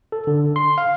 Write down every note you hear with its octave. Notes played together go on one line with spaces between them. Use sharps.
A4
D3
C6
F5